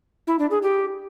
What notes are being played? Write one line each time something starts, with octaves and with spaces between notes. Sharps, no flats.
E4
D4
G#4
G4